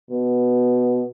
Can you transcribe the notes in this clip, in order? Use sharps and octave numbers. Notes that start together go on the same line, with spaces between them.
B2